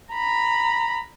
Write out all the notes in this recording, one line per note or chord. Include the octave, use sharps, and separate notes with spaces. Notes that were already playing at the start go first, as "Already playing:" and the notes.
A#5 B5